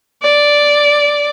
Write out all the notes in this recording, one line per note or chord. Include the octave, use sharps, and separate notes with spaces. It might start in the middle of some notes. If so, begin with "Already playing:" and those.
D5